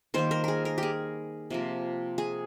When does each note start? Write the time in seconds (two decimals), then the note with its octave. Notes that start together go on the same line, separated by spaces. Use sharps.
0.14 D#3 G3 A#3 C5
0.31 A#4
0.44 G#4 A#4
0.65 A#4
0.78 G4
0.83 G#4
1.50 C3 F3 A#3
2.18 G#4